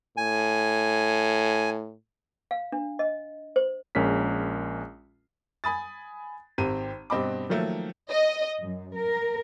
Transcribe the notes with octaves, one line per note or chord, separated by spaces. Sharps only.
A2 G#5
F5
D4
D#5
C5
A#1 G#3 C#4 A#4 B6
G#5 B5 D#6 A6
G#1 C4 G4 D#7
G2 B2 C4 D#5 B5 D6
D#3 F3 F#3 A3 A#3
D#5
F#2
A#4